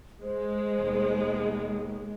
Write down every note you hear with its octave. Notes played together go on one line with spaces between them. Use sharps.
G#3 C5
D#2 B2